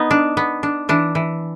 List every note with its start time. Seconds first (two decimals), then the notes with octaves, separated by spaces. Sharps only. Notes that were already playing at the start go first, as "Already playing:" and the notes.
Already playing: B3 D#4
0.11 D4
0.37 B3
0.63 D4
0.89 E3 D4
1.15 E3